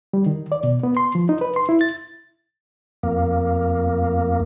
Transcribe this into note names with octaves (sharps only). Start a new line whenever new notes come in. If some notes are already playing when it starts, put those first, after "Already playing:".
G3
D#3
D5
B2
B3
C6
F3
D#4
B4
C6
E4
A6
F2 A#3